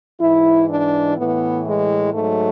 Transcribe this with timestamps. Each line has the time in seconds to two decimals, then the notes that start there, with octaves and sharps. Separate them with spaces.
0.20 G#2 E3 E4
0.68 D4
1.16 A2 E3 B3
1.65 G#3
2.13 G#2 F#3 A3